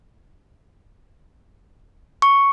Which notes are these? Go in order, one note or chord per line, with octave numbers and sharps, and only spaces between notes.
C#6